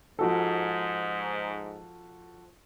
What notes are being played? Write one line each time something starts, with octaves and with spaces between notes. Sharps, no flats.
G#2 F3 F#4 A4